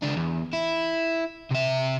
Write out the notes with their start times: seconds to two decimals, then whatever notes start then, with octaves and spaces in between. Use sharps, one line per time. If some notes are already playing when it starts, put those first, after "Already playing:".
0.02 C#2 D4
0.16 E2
0.53 E4
1.51 C3 E5